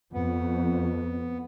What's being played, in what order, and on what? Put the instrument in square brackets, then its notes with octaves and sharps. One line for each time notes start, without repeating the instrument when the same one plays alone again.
[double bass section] F2 [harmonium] B3